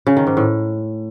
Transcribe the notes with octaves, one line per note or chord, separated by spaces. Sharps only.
C#3
D#3
G#2
A2